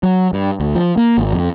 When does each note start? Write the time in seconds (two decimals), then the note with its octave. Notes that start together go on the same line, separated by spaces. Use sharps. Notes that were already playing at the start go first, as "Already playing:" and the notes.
0.03 F#3
0.33 G2
0.60 D2
0.75 F3
0.97 A#3
1.18 G#1
1.33 F2